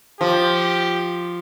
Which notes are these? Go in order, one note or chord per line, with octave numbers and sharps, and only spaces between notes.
F3 G4